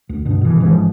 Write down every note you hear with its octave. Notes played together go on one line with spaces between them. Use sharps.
D2
G2 B2
B2 E3
A1 G#2 E3 F3